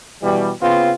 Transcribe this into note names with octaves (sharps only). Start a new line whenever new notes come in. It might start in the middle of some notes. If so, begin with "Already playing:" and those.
B2 E3 G3
C#3 B3 C4 F4